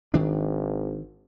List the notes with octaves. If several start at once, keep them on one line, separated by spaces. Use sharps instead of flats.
G#1 D#3 D4